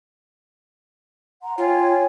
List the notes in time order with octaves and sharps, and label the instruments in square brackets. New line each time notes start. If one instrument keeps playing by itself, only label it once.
[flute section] F#5 A#5 C6
[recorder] F4 [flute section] C#5 G5 G#5